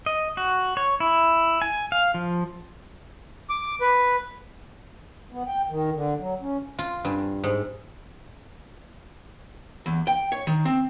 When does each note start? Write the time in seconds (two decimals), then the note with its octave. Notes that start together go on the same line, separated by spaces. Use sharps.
0.06 D#5
0.37 F#4
0.77 C#5
1.00 E4
1.62 G#5
1.92 F5
2.14 F3
3.49 D6
3.81 B4
5.32 B3
5.47 G5
5.69 D#3
5.95 D3
6.20 F#3
6.42 C#4
6.79 F4
7.05 G2
7.44 G#2
9.86 E2
10.07 G5
10.32 C#5
10.47 D#3
10.65 C4